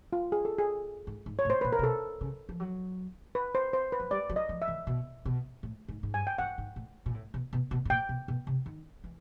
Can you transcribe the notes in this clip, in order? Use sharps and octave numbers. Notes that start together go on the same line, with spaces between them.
F4
G#4
A4
G#4
G#2
G#2
C#5
A2
C5
A#2 B4
A#4
C3
B2 A4
C#3
F3
F#3
B4
C5
C5
B4
F#3
G3 D5
F#3
D#5
F3
E5
E3
B2
B2
A2
G#2
G#2
G2 G#5
G5
G2 F#5
G#2
A2
A#2
A2
B2
B2
B2
A2
A#2 G5
B2
B2
C3
D#3
E3